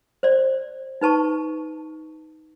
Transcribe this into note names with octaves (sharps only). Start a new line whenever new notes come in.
C5 D5
D#4 B4 A5 C#6